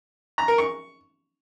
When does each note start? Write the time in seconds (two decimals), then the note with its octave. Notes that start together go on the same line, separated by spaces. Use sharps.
0.38 A#5
0.48 A#4
0.58 C#6